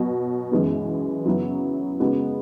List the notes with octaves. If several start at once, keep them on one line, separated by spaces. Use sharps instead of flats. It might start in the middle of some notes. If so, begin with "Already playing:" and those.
Already playing: B2 F#3
F#2 E3 G#3 B3
F#2 C#3 F#3 B3 E4
C#3 G#3 B3 F#4